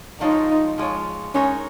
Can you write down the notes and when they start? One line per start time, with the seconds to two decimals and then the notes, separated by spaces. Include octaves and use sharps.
0.21 F3 G#3 D#4 F4 C#5
0.78 F3 G#3 F4 C#5
1.34 G#3 C#4 D#4 A#4 C#5